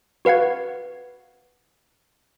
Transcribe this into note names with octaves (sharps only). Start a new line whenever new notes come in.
F#4 B4 F5 F#5 G#6